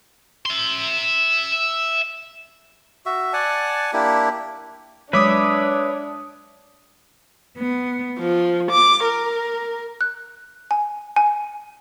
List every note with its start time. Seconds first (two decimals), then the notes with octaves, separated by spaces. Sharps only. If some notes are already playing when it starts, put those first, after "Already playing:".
0.45 E5 C6
3.06 F#4 E5
3.33 D5 F#5 G#5 A5
3.93 A#3 D4 E4 G4
5.13 F#3 G#3 D4 B4 C#5 E5 D6 D#6
7.56 B3
8.17 F3
8.71 D6
9.03 A#4
10.01 F#6
10.71 G#5
11.16 G#5